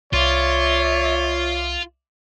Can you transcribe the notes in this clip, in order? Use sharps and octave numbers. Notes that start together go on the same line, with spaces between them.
C2 F4 C#5 D5 E5